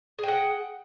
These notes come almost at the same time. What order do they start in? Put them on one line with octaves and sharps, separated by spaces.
G#4 G5 F#5